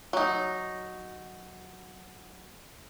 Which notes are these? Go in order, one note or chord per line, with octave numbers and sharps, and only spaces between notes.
F#3 D#4